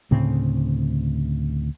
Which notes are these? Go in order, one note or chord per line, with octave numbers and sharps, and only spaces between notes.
D2 A2 C#3 C4